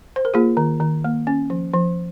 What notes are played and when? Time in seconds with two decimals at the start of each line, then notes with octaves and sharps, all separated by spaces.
0.16 C5
0.25 A#4
0.34 A#3 F4 G#4
0.57 D#3
0.80 D#3
1.05 A#3
1.27 C#4
1.50 F3
1.74 F3